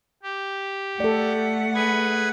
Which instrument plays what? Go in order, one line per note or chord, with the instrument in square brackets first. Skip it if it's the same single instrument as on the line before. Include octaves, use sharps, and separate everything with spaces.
[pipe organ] G4
[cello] A3 F#5 [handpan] A4 D5
[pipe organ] G#4 B4 G#6